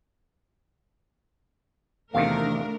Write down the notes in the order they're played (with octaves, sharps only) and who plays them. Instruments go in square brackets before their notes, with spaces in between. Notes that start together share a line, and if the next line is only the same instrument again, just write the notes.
[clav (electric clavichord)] E2 C3 D#3 [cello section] A3 D4 A#4 [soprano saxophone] F5